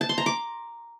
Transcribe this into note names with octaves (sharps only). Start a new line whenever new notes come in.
A5
C6
A#5
D6